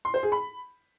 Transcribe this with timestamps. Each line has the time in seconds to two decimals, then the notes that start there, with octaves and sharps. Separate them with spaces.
0.05 C6
0.14 C5
0.23 G#4
0.32 B5